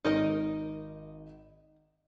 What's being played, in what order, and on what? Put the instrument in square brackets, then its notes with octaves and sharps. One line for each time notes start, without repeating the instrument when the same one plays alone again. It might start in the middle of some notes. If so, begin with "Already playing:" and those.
[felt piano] G#1 [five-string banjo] D#4 A#4 D#5